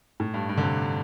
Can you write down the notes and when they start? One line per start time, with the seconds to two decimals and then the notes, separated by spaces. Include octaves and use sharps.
0.20 A2
0.34 G2
0.49 G2
0.58 D3
0.63 C3